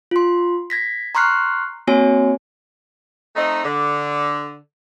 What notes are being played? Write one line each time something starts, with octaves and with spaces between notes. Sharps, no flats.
F4 C6
G#6 A#6 B6
A#5 C6 C#6 F6 F#6 C7
A#3 C4 F#4 C#5 G#5
A3 C4 D#4
D3